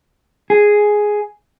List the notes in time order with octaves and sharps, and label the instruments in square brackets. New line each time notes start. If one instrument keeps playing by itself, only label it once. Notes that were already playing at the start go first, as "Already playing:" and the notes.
[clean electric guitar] G#4